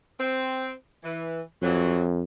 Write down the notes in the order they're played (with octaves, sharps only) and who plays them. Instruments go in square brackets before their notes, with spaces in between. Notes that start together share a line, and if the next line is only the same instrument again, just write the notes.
[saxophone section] C4
E3
[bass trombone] F2 [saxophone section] E3 F#3